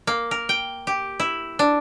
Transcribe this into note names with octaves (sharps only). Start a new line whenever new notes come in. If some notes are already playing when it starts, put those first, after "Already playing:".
A#3
A#4
G5
G4
E4
D4